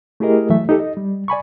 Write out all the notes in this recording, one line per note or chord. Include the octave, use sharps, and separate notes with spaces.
A3 E4 G4 G#4 A#4 D#5
E3 F#3 A3 E5
D#4 G4 A4
D#5
G3
D5 G#5 B5 C#6